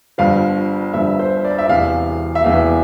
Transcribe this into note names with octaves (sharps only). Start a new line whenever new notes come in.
G1 G2 F3 F5
G1 G2 F3 E5
C5
D5
E5
E1 E2 C3 E3 F5
E5
E1 E2 C3 E3 F5